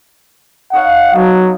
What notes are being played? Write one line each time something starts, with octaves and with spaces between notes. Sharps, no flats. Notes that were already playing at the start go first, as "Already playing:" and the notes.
D#4 C#5 F5 F#5
F#3 B3 D#4 A5